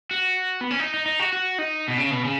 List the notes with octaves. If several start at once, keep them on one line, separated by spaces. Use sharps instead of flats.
F#4
B3
C#4
D#4
D#4
D#4
F#4
F#4
D#4
B2
C#3
B2
C#3